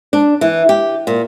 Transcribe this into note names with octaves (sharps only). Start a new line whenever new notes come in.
D4
E3
G4
A#2